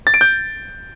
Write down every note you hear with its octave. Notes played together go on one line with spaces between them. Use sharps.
A6
D7
G6